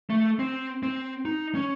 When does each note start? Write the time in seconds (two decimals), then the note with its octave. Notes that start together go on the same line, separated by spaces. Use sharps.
0.10 A3
0.39 C4
0.83 C4
1.25 D#4
1.55 C#4